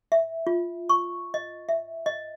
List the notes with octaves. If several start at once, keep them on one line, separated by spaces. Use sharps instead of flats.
E5
F4
C#6
D#5
E5
D#5